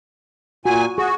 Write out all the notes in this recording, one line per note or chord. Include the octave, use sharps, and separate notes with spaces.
A#2 F#4 G#5
F#4 G#4